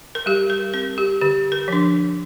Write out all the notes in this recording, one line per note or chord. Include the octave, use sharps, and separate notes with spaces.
A#4
G3 G4
A#4
C4 A#4
G4
D3 G4
A#4
F3 D4